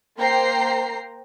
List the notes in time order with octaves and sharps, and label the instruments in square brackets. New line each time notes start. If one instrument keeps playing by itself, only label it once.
[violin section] A#3 C5 G5 A#5 C7